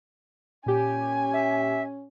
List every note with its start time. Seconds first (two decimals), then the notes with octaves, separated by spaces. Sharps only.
0.66 A#2 C#4 G4 G#5
1.33 E5